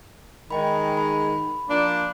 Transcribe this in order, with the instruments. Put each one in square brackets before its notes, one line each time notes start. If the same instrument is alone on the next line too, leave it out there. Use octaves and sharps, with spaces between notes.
[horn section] D#3 G#3 [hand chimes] D#5 G5 B5
[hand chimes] B5
[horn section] F3 A#3 D4